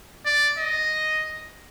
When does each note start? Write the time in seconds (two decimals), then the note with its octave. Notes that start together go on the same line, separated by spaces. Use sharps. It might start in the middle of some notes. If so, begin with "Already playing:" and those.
0.26 D5
0.58 D#5